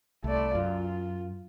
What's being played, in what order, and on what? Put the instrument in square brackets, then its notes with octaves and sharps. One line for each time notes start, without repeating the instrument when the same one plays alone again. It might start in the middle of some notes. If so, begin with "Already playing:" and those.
[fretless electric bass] C2 [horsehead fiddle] A3 D5
[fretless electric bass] F#2 [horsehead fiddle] F4